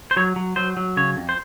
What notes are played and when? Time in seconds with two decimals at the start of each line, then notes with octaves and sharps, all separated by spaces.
0.11 C5
0.17 F#3 C#5
0.36 F#3
0.56 F#3 C5
0.77 F#3
0.97 C#3 C#5
1.17 F2
1.29 C5